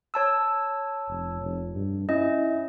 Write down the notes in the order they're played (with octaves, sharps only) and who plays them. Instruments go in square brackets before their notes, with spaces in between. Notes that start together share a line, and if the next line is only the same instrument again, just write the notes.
[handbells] C#5 A5 E6
[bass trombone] F1
F1
G2
[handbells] C#4 D#5 [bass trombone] E4